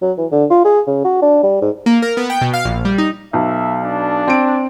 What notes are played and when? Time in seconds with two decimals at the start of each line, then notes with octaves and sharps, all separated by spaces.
0.02 F#3
0.18 E3
0.32 D3
0.50 F4
0.65 G#4
0.87 C#3
1.04 F#4
1.22 D4
1.43 G3
1.62 G#2
1.86 A#3
2.02 A#4
2.17 B3
2.30 G5
2.41 B2
2.53 F5
2.65 A#1
2.85 G3
2.98 D#4
3.33 B1 E5
3.82 D4
4.27 C4 D7